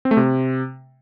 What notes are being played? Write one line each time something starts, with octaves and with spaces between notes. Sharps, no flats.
C4
A3
C3